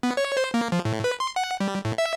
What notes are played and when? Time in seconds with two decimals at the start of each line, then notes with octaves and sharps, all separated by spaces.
0.03 B3
0.17 C#5
0.37 C5
0.54 A#3
0.72 F3
0.85 A2
1.04 B4
1.20 C6
1.36 F#5
1.60 G3
1.85 A2
1.98 E5